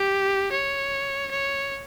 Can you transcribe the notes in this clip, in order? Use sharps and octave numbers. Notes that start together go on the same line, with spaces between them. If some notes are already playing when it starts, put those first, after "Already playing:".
Already playing: G4
C#5
C#5